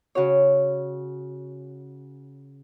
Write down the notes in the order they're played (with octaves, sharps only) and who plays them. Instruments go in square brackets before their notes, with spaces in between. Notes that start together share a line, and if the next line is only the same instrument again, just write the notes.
[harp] C#3 F#4 C#5